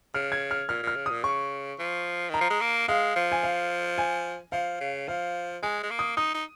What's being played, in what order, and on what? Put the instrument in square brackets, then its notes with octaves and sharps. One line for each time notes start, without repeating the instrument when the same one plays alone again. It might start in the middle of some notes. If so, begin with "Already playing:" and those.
[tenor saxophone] C#3 [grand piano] F6
[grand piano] G#6
F6
[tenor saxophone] A#2 [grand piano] F6
[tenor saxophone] A#2 [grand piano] F6
[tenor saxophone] C#3
[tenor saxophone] A#2 [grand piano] D#6
[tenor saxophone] C#3 [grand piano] C#6
[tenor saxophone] F3
[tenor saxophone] D#3 [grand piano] A#5
[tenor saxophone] F3
G#3
A#3
[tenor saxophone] G#3 [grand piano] F5
[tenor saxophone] F3
[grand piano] G#5
F5
G#5
[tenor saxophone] F3 [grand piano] F5
[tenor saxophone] C#3
[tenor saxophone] F3 [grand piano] F5
[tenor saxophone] G#3 [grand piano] G#5
[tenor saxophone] G#3
A#3
[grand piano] D#6
[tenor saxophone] D#4 [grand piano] D#6
[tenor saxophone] D#4